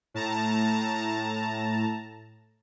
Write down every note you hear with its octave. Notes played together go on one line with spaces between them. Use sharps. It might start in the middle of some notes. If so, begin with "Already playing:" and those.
A2 A5 A#5